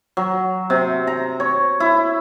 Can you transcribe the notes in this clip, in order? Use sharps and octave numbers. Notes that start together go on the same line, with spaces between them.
F#3
C3
A#5
C#5
E4